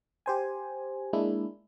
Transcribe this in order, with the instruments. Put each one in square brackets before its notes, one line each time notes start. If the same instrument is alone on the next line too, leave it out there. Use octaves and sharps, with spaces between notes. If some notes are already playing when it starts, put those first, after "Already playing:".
[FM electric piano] G4 C5 G#5
G#3 A#3 D4 E4